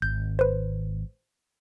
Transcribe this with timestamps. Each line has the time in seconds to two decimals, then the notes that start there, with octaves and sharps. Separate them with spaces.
0.02 G#1 G6
0.39 B4 C5